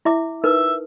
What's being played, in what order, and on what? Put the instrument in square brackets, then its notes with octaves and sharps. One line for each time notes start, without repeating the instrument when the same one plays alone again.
[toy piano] E4 E5 D6
[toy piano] D#4 A#4 B4 [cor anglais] E5